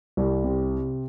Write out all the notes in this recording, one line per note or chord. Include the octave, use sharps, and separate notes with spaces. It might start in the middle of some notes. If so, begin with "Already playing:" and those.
C2
C3